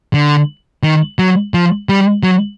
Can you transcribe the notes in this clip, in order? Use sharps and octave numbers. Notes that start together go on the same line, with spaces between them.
D3
D#3
F#3
F3
G3
F#3